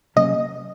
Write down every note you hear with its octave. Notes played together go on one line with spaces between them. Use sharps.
C3 F#3 A#3 C#4 D#5